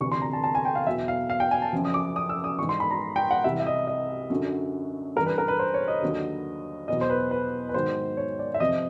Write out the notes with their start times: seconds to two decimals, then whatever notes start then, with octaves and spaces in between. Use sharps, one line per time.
0.01 D2 C3 E3 C#6
0.12 C6
0.22 A#5
0.33 A5
0.44 A5
0.55 G#5
0.65 G5
0.75 F5
0.87 E2 B2 F#3 E5
1.08 F5
1.30 F5
1.40 G5
1.51 G#5
1.62 A5
1.73 F#2 C#3 F3
1.85 D#6
1.94 D6
2.16 D#6
2.29 E6
2.44 D#6
2.59 E3 C#6
2.62 G#2
2.69 C6
2.80 B5
2.91 A#5
3.16 G5
3.31 F#5
3.44 C2 C3 E3 E5
3.60 E5
3.66 D#5
3.87 D#5
4.30 F#2 D3 F#3
5.16 G2 E3 A#4
5.26 B4
5.38 A#4
5.48 B4
5.59 C5
5.74 C#5
5.88 D#5
6.02 D#2 D3 F#3
6.88 E2 B2 F#3 D#5
7.01 C5
7.10 B4
7.31 B4
7.69 B4
7.74 G#2 D#3 F#3 C5
8.17 C#5
8.39 D5
8.54 E5
8.60 F2 C3 F3 D#5